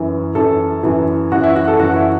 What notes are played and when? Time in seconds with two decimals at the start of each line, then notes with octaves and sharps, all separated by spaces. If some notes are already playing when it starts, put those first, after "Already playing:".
Already playing: F#2 E3
0.35 F#2 E3 A4
0.83 F#2 E3
1.32 F#2 E3 F#4
1.44 E4
1.56 F#4
1.68 A4
1.79 F#2 E3 F#4
1.96 E4